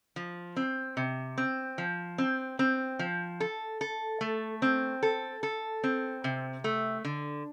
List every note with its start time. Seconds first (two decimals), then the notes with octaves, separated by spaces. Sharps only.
0.16 F3
0.56 C4
0.97 C3
1.38 C4
1.78 F3
2.18 C4
2.59 C4
2.99 F3
3.40 A4
3.81 A4
4.21 A3
4.62 C4
5.03 A4
5.43 A4
5.84 C4
6.24 C3
6.64 A3
7.05 D3